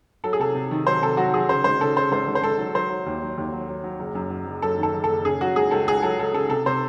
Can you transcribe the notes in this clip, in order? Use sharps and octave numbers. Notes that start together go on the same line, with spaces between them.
F#3 A4
G#4
C3 A4
C3
D#3
F#3 C5
C3 A4
F#3 F#4
F#3 G#4
C#3 C5
G#1 C5
C#3 A4
C#3 C5
G#1 C5
G#1
C5
G#1 A4
F#3
F#3 C5
F#3
D#2
F#3
D#2
F#3
F#3
F#3
F#1
F#2
F#3
F#1
F#2 A4
D#3 A4
F#1
A4
F#1
C#3 G#4
F#3 F#4
C#2 G#4
C#2 A4
C#2 G#4
F#3 A4
C#2 A4
C#3 A4
C3 A4
C3 C5